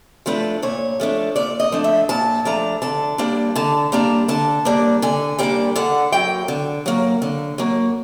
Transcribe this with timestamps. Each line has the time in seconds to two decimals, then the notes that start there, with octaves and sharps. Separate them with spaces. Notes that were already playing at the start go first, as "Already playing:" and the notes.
0.26 F3 A3 D4 B4
0.62 A#2 C#5
1.00 F3 A3 D4
1.36 A#2 D5
1.60 D#5
1.72 F3 A3 D4
1.84 E5
2.09 A#2 A5
2.45 F3 A3 D4 A#5
2.82 D3 A5
3.18 G3 A#3 D4
3.56 D3 A5
3.92 G3 A#3 D4 A#5
4.28 D3 A5
4.65 G3 A#3 D4
5.02 D3 G#5
5.39 G3 A#3 D4 G5
5.76 D3 F#5
6.12 F#3 A#3 G5
6.48 D3
6.86 F#3 A#3
7.22 D3
7.58 F#3 A#3